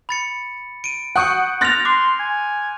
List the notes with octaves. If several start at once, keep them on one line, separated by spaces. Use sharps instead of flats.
B5 A6 C#7
D7 D#7
F#5 C#6 D#6 F#6 G6 C#7
C6 F6 F#6 A6 A#6 F7
C6 D6
G#5